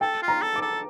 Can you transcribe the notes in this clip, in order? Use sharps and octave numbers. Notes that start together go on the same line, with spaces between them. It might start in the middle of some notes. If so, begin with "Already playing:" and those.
A4 G5
F4
A#5
A4
D6
A4